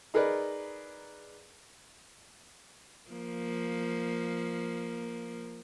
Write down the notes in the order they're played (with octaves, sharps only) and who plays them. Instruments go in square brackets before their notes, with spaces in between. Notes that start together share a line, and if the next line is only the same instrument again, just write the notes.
[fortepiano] D#4 G#4 A#4 B4 D5
[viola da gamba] F3 A#3